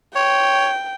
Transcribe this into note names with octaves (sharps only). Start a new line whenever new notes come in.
C#5 G5